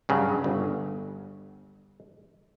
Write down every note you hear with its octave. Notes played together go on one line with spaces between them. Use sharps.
G2 C#3 F#3
G1